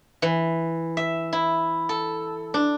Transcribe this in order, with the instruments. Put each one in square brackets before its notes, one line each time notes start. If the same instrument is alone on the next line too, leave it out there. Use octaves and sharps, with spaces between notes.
[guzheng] E3
E5
E4
A4
D4